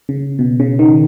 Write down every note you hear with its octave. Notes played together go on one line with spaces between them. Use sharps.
C#3
B2
C#3
D#3